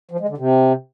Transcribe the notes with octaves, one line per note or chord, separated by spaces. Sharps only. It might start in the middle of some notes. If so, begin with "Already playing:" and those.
F3
G#3
D3
C3